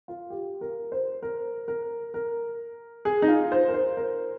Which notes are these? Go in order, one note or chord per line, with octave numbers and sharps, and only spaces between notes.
F4
G4
A#4
C5
A#4
A#4
A#4
G#4
D#4
F4
C5
A#4
C5
A#4